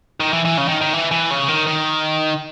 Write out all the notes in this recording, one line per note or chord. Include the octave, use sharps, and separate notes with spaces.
D#3
E3
E3
C#3
D#3
D#3
E3
E3
C#3
D#3
D#3